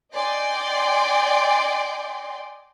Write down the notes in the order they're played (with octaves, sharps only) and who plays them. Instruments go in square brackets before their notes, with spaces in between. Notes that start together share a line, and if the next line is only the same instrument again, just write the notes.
[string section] D5 D#5 G5 G#5 C6 D6